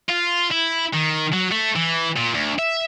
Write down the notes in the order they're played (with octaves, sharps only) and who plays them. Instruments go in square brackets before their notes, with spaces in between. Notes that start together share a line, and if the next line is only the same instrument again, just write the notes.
[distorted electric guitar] F4
E4
D#3
F#3
A3
E3
A#2
D2
E5